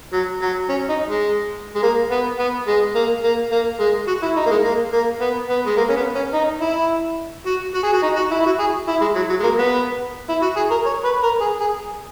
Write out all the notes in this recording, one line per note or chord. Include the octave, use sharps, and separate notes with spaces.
F#3
F#3
C#4
D#4
G#3
G#3
A#3
B3
B3
G#3
A#3
A#3
A#3
G#3
F#4
E4
D#4
A#3
G#3
A#3
A#3
B3
B3
G#3
A#3
C#4
B3
C#4
D#4
E4
F#4
F#4
G#4
F#4
D#4
F#4
E4
E4
F#4
G#4
E4
G#3
F#3
F#3
G#3
A#3
B3
E4
F#4
G#4
A#4
C#5
B4
A#4
G#4
G#4